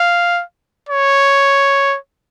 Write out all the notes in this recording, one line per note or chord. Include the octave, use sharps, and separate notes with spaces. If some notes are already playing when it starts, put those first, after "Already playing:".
Already playing: F5
C#5